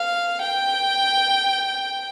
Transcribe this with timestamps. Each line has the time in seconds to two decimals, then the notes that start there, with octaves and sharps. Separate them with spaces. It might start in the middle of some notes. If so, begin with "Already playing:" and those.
Already playing: F5
0.42 G5